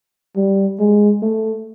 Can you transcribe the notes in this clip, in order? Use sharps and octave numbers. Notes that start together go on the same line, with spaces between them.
G3
G#3
A3